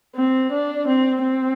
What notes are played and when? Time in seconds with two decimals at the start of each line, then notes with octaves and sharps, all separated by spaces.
0.15 C4
0.51 D4
0.87 C4
1.22 C4